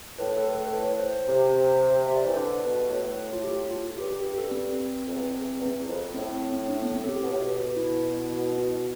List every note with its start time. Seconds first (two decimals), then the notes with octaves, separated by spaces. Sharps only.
0.19 A2 B4
0.37 A4
0.46 B4
0.54 A4
0.73 B4
1.00 C5
1.27 C3
2.07 E5
2.16 D5
2.24 E3 C5
2.35 D3 B4
2.62 B2
2.78 G2
2.89 A2
3.33 F4
3.44 G4
3.71 F4
3.98 G2 G4
4.11 G4
4.25 G4
4.38 A4
4.51 C4
5.06 F2
5.15 E2
5.33 E2
5.59 E2
5.87 F2
6.15 A2 C4
6.69 D4
6.82 B3
6.96 C4
7.04 A4
7.09 G4
7.22 B2
7.31 A2
7.40 B2
7.77 E4